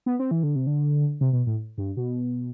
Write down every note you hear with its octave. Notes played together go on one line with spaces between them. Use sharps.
B3
C4
E3
D3
C3
D3
C3
B2
A2
G2
B2